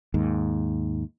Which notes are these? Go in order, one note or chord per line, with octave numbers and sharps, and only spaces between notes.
D#2 G#2